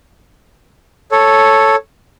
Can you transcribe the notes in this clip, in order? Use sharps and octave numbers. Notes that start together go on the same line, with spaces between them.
A4 C#5